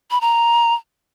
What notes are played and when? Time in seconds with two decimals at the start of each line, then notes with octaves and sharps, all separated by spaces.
0.11 B5
0.21 A#5